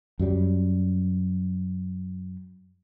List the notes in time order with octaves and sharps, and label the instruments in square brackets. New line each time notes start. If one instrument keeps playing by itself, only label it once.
[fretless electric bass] F#2 F#3 G3